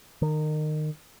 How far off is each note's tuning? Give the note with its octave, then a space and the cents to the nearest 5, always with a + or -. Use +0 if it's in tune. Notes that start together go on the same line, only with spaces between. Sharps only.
D#3 -25